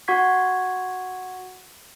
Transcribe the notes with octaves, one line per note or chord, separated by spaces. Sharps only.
F#4 F#5 C#6 G#6 B6